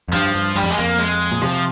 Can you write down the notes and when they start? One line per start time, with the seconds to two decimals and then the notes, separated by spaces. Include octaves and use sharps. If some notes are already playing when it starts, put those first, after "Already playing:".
0.08 F2
0.13 G2 F3
0.35 G2
0.56 G2 G3
0.63 F2
0.70 G#3
0.77 F2 A#3
0.99 G#3
1.32 A#2
1.42 C3 F3